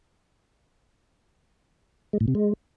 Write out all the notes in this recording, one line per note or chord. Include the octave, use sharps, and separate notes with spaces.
G#3
A2
C3
G#3